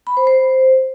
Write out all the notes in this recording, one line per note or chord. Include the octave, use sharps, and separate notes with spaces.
B5
C5
C5